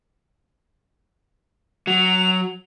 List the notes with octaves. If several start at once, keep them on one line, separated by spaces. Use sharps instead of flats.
F#3 F7